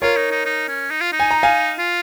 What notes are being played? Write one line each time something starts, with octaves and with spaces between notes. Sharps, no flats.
F4 A#4 C#5
D#4
D#4
D#4
C#4
D#4
F4
D#4
G#5
A#5
F5 G#5
F4